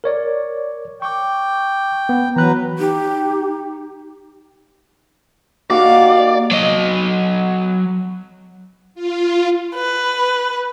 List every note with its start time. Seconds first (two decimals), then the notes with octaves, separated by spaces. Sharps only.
0.04 A#4 C#5 D5
1.02 G5 C#6 D6
2.09 B3
2.36 E3 F#3 B4 A#5 F#6
2.79 D#4 G4
5.70 A#3 D#4 F#4 G4 D5 F5
6.51 F#3 D#5
8.95 F4
9.75 B4